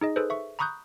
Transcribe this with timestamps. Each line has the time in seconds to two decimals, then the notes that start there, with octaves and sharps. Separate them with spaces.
0.01 D#4 G#4 D#5
0.16 G#4 A4 B4 C5
0.30 E5 C#6
0.59 A#5 B5 C#6 D#6 F#6 G6